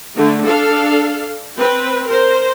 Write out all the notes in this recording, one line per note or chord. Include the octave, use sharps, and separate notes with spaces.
D3 A3
D4 A4 F5
C4 B4
A#4 C5